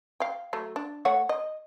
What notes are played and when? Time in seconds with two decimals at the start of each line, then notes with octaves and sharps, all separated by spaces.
0.20 F5 G5
0.53 F#3 A3
0.76 D4
1.05 A3 C#5 F#5
1.29 D#5